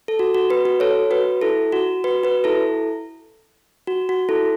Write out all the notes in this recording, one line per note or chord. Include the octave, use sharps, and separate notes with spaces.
A4
F#4
F#4
F#4 B4
F#4
A4 C#5
F#4 B4
E4 A4
F#4
F#4 B4
F#4 B4
E4 A4
F#4
F#4
E4 A4